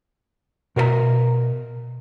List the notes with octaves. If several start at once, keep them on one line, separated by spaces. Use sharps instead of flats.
B2 A#4 C5 E5 A#5